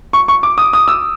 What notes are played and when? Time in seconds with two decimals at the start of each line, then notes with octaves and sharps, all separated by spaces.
0.13 C#6
0.28 C#6
0.43 D6
0.58 D#6
0.73 D#6
0.88 E6